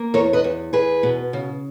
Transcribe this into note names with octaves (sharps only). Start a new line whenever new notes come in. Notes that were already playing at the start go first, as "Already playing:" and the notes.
Already playing: A#3
E2 A#4 C#5
B4 D#5
E2
E2 G#4 B4
B2
C#3